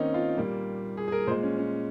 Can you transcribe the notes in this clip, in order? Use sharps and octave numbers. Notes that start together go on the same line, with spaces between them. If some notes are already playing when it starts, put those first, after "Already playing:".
Already playing: D#3 A#3 C4 C#4 D#4
F4
A#2 G3 A#3
G#4
G#4
A#4
A#2 G#3 C5
C#4
C#4